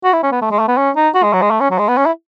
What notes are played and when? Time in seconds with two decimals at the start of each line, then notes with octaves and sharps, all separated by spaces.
0.04 F#4
0.13 E4
0.23 C#4
0.31 B3
0.42 A3
0.51 G#3
0.59 A3
0.68 B3
0.77 C#4
0.96 D#4
1.14 F#4
1.23 G#3
1.33 F#3
1.42 G#3
1.51 A3
1.60 C#4
1.70 F#3
1.79 G#3
1.88 B3
1.97 C#4
2.06 E4